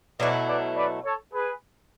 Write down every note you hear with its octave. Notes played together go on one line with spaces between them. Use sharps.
B2 F#3 A3 E4 B4 D5
B4 D5
B4 D5
A4 C#5
G#4 B4